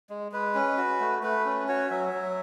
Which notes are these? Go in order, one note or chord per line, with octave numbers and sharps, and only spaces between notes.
G#3
G#3 B4
C#4
F#4
A3
A3 B4
C#4
F#4 C#5
F#3 E5
F#3